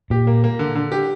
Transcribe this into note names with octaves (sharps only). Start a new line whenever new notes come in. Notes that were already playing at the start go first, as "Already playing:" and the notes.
A#2 G4
A#3
A#3
D3
D3
G4